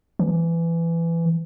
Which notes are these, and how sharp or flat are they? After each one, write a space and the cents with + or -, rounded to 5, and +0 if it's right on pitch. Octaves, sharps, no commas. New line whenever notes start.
E3 +20